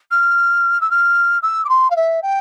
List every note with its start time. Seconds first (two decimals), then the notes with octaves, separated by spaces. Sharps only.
0.11 F6
0.81 E6
0.91 F6
1.43 E6
1.65 D6
1.69 C6
1.90 F5
1.96 E5
2.23 G5